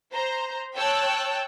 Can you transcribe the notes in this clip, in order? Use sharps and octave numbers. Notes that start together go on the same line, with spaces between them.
C5 A#5
C#5 G5 A5 E6 F#6